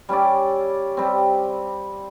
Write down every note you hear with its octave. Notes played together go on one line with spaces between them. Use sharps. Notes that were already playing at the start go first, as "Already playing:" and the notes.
G3 C#4 E4 D5
G3 C4